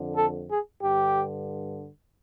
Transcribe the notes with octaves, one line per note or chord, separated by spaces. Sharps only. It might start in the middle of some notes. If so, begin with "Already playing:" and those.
Already playing: F2 D3
A4
G#4
G2 D3 G4